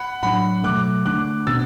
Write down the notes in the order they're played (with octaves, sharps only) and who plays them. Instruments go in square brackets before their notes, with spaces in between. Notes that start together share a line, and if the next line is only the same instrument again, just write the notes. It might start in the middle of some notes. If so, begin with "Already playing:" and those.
Already playing: [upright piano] F#5 B5
[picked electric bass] A2 F#3 D4 [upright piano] F#5 B5
[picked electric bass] B2 F#3 A3 [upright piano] D6 F#6
[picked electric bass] D3 A3 D4 [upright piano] D6 F#6
[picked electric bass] B2 B3 D4 [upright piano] E6 A6